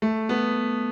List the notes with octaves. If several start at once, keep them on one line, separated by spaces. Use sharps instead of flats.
A3
B3